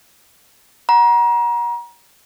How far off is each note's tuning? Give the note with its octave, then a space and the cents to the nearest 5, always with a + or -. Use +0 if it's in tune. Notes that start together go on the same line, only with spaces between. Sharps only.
F#5 +20 A#5 +35